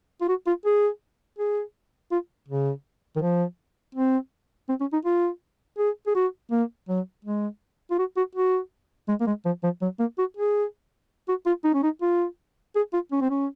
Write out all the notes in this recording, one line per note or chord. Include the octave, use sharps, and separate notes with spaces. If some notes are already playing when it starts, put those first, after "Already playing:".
F4
F#4
F4
G#4
G#4
F4
C#3
D#3
F3
C4
C4
C#4
D#4
F4
G#4
G#4
F#4
A#3
F#3
G#3
F4
F#4
F#4
F#4
G#3
A#3
G#3
F3
F3
F#3
A#3
F#4
G#4
F#4
F4
D#4
C#4
D#4
F4
G#4
F4
C#4
C4
C#4